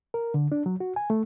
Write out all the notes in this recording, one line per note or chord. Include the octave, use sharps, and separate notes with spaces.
A#4
D3
D4
F#3
F#4
G#5
A3